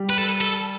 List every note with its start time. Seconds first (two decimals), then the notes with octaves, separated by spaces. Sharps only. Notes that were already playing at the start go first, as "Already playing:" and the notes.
Already playing: G3
0.09 B4
0.18 A4
0.41 A4